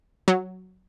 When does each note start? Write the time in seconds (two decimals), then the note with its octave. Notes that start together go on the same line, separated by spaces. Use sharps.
0.28 F#3